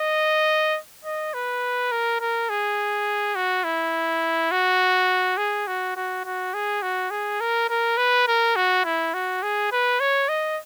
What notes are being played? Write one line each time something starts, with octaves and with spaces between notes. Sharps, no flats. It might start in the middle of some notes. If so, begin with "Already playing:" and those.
Already playing: D#5
D#5
B4
A#4
A#4
G#4
F#4
E4
F#4
G#4
F#4
F#4
F#4
G#4
F#4
G#4
A#4
A#4
B4
A#4
F#4
E4
F#4
G#4
B4
C#5
D#5